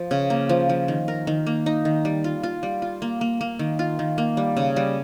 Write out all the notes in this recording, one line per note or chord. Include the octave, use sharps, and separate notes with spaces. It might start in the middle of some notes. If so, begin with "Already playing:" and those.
Already playing: F3
C#3
A#3
F3
F3
D#3
A#4
D#3
A#3
D#4
D#3
G3
F4
F4
G3
F4
A#3
A#3
A#3
D#3
F4
D#3
A#3
G3
C#3
G3